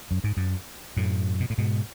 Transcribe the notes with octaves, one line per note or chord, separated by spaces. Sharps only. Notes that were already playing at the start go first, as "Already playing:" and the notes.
F#2
G#2
F#2
F#2 A2
B2
A2
G#2 B2